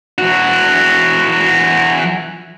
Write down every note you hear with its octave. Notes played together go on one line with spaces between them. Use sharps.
E3 F#4